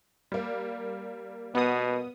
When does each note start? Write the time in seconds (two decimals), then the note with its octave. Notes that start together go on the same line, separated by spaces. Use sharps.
0.32 G3 A#3
1.55 B2 B3 D#6